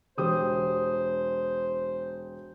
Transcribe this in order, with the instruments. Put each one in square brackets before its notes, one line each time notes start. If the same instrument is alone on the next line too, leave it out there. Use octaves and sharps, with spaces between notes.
[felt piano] E1 G4 D#6 [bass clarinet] C5